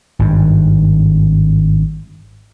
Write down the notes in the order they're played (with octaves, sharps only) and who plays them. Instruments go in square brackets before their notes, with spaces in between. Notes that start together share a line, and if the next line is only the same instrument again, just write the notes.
[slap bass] G#1 G2